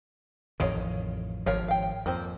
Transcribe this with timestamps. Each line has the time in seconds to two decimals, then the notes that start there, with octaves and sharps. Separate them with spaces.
0.60 A1 F2 D#3 C#5 D#5 F5
1.46 G#1 F3 A#4 C#5 F5
1.68 F5 G5
2.06 F2 A#3 C4 C5